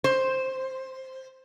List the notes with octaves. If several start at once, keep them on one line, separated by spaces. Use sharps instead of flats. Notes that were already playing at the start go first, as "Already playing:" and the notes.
C5